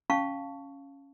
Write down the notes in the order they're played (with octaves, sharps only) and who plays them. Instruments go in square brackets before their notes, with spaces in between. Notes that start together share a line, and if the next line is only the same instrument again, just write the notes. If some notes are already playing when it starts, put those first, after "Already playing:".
[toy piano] C#4 F5 A5 C#6